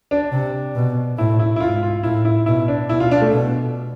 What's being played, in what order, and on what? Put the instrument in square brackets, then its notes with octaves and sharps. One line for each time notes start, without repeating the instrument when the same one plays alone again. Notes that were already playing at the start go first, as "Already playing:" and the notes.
[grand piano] D4
[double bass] C3
B2
[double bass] A2 [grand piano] E4
[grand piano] E4
E4
[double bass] G#2 [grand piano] F4
[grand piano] F4
[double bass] A2 [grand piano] E4
[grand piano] E4
[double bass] B2 [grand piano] E4
[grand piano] D4
[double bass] B2 [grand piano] E4
[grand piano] F4
D4
A3
[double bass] B2